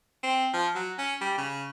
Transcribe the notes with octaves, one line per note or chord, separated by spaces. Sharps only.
C4
F3
F#3
C#4
G3
C#3